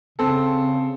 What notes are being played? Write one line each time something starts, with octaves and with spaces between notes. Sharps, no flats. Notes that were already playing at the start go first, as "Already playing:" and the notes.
C#3 C4 A4